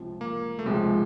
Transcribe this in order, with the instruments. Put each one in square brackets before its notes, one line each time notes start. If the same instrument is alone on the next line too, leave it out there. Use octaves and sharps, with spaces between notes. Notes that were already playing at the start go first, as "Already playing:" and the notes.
Already playing: [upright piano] C#2 C3 F3
[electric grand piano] A#3
A3
[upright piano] C#2 C3 F3 [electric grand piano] G#3